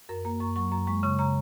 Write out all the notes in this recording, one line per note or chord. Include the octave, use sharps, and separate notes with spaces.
F#2 A#4
A#3 A#5
F#2 C#6
F#3 C#6
F#2 A#5
G#3 C#6
C#3 C#6
C#3 A#5